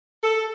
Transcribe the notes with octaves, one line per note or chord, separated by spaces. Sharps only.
A4